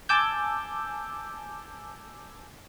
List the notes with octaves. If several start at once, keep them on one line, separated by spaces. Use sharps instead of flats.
G#5 A5 D6 E6 G6